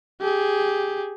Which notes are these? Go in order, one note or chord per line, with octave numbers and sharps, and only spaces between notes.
G4 G#4